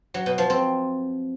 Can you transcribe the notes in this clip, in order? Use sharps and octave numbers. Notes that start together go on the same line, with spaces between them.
F#3
B2
F3
C4